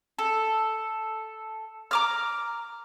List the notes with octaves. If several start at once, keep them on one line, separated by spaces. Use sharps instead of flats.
A4
A#5 D6 F6